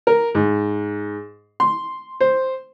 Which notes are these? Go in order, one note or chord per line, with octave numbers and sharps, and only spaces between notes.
A#4
G#2
C6
C5